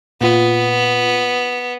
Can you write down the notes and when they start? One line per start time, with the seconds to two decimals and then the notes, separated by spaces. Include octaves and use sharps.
0.21 A#2 B3 F4